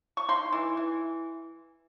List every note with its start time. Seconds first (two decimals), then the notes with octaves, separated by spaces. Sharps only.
0.17 C#6
0.28 D#4 C6
0.53 E3
0.77 E3